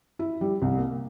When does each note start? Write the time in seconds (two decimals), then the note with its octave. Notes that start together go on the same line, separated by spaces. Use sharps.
0.19 E4
0.41 G3
0.62 C2
0.78 A#3